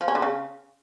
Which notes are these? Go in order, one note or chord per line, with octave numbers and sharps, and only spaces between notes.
F3
C#4
D3
C#3